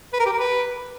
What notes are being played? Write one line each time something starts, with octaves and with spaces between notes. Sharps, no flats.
B4
A#4
G4
A#4
B4